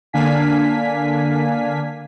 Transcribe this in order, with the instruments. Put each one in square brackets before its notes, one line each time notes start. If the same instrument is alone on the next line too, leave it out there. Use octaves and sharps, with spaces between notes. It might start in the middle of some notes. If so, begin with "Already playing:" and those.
[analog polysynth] D3 A#3 D4 F5 G#5 B6